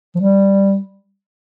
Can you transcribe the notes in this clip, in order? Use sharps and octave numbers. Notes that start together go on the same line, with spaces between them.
F3
G3